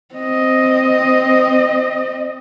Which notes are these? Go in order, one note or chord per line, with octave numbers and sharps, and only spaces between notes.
C4 D#5